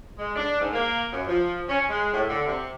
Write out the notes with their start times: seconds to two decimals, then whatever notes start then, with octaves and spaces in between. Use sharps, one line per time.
0.18 G#3
0.36 D4
0.59 G#2
0.72 A#3
1.11 F#2
1.27 F3
1.69 C#4
1.88 G#3
2.12 A2
2.28 D3
2.46 C3